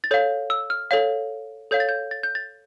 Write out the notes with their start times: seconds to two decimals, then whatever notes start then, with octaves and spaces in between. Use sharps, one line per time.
0.04 A6
0.11 A4 C#5 F5 G6
0.50 E6
0.70 F6
0.91 A4 C#5 F5
1.71 A4 C#5 F5 G6
1.80 A6
1.89 G6
2.11 A6
2.23 G6
2.35 A6